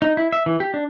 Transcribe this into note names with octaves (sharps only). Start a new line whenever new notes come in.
D#4
E4
E5
E3
G4
D4